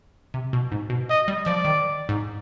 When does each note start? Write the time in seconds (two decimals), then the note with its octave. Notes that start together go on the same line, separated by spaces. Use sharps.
0.34 C3
0.53 B2
0.72 G#2
0.90 B2
1.10 D#5
1.28 G3
1.46 F3 D5
1.65 D#3
2.09 G#2